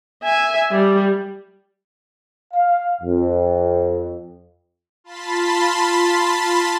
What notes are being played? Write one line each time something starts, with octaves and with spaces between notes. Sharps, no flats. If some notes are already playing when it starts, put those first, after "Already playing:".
E5 G#5
G3
F5
F2
F4 A5 B5 C6 A6 B6